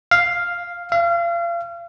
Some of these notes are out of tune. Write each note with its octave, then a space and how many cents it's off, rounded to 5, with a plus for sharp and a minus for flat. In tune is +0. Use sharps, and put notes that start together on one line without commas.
F5 +0
F5 -35